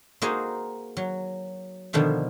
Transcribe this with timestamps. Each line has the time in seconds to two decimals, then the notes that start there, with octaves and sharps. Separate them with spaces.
0.22 A#3 D#4 F#4 G#4 C5 D#5
0.97 F#3
1.93 B2 D3 D#3 F3 D4